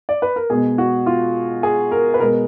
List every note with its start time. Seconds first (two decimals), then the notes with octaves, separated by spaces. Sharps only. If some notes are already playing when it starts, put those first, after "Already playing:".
0.09 D5
0.22 B4
0.36 A#4
0.50 B2 G#3 B3 G#4
0.78 F#4
1.06 F4
1.63 G#4
1.91 A#4
2.14 B4
2.20 B2 G#3 B3 A#4